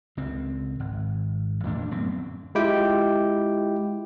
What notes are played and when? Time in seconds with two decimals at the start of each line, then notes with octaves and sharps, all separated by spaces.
0.17 C#2 C4
0.80 G#1
1.64 E2 A#2 A3 D4
1.91 D1 F#2 B3 C4
2.55 G#3 E4 F4 G4 G5